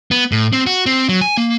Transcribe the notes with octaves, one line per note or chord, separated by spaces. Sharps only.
B3
A2
C4
F#4
C4
F#3
G#5
A#3